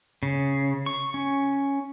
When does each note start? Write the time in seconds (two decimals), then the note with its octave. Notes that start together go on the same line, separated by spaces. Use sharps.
0.23 C#3
0.86 C#6
1.14 C#4